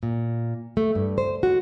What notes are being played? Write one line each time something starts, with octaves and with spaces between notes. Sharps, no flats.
A#2
A3
G2
C5
F#4